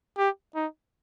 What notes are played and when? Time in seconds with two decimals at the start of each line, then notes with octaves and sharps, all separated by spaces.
0.18 G4
0.55 D#4